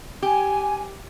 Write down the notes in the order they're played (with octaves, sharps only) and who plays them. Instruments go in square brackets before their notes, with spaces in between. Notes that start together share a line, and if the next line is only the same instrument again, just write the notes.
[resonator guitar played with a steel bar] G4 [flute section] G#5